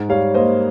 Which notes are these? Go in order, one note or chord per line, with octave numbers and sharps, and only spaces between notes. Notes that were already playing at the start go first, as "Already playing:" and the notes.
Already playing: G#2
G3 C#5 F5
A#3 C5 D#5